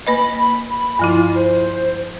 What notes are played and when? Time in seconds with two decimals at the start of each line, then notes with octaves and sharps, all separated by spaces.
0.07 A#3 B4 D#5 B5
0.70 B5
0.99 G2 F3 E4 F4
1.34 C5